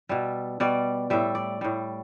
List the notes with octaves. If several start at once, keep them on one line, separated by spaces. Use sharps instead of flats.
B2 G3 E5
B2 G3 D5
A2 G3 E5
D5
A2 G3